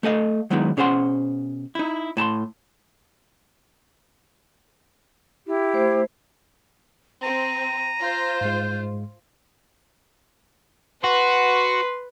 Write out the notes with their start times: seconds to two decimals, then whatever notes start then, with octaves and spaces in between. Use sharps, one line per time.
0.03 A3 A4 D#5 F5
0.50 D#3 F#3 G#3 B3 D#4 E4
0.77 B2 C#4 G#4 C5 F#5 C6
1.75 D#4 E4
2.17 A2 A5 A#5 C6
5.46 E4 G4
5.74 A3 C5
7.23 C4 A#5 D#7
8.03 F4 C5 G6
8.41 G#2 G#3
11.04 F#4 B4 C6